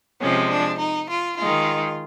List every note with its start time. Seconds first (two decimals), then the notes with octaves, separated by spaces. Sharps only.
0.20 C3 F3 G#3 C#4
0.50 D4
0.79 D#4
1.09 F4
1.38 D#3 G#3 F4